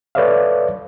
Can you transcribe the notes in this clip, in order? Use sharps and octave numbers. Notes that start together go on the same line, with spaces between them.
A4 B4 C#5 D5 E5 F5